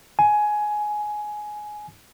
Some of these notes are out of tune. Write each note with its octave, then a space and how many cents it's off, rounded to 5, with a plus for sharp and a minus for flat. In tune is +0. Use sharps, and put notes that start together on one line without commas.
G#5 +15